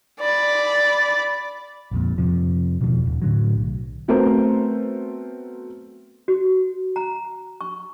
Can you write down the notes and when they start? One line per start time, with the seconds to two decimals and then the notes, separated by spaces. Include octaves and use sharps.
0.21 D5 B5
1.91 A#1 F2 A#2
2.18 F2 C3 F3
2.81 E1 B2 D#3 F3
3.06 D#1
3.22 A2 D3 F#3
3.56 B1
4.08 F#3 A3 B3 C4 A#4 C5
6.28 F#4
6.96 A#5
7.61 C#6